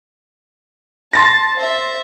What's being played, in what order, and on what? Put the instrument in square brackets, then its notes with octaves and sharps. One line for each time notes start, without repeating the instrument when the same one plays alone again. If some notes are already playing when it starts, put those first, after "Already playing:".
[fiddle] A5 [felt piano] C6 A6 A#6
[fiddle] C5 E5